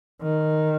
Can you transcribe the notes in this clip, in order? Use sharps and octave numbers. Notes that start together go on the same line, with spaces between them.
D#3